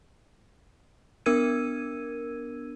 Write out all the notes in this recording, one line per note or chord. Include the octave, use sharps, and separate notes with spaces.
B3 D4 A#4 E6 G#6 D#7